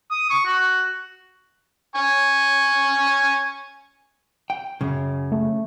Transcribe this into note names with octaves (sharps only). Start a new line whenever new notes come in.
D#6
C#6
F#4
G#5 C#6
G5
F#2 C#3
A3